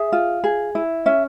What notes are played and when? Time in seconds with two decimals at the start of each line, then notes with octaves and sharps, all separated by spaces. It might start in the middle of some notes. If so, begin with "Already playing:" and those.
Already playing: G#4 E5
0.12 F4
0.44 G#4
0.75 E4
1.06 C#4 E5